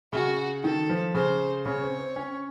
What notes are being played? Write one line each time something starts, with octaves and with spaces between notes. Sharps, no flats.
C#3 F#4
D#3 A4
F3
C#3 C5
C#3 C#5
C4
C4
C#4